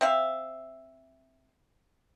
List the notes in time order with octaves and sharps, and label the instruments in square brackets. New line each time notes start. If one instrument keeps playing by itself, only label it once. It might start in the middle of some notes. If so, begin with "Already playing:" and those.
[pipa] C4 E5 F5